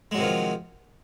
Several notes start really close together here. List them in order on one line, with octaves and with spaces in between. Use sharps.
G#3 F#3 C3 D#3 F3